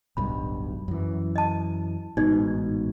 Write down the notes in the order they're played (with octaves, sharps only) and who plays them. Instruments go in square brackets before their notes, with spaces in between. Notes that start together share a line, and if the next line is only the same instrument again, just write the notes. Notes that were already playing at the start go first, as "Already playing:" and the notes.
[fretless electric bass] D1 B1 G2 [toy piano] B5
[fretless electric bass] F#2 E3
[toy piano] D#5 A5
[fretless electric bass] A1 G#2 B2 [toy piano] D#4 D5